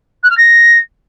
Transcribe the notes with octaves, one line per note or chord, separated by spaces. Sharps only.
F#6
F6
A#6